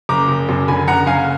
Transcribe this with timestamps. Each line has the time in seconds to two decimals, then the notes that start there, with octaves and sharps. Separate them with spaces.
0.09 F#1 A#5 D6
0.29 F#1
0.49 F#2
0.68 D3 G#5 B5
0.87 F#1 F#5 A#5
1.06 F#1 F5 G#5